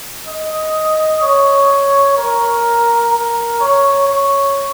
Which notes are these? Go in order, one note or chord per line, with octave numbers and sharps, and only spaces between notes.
D#5
C#5
A#4
A#4
C#5
C#5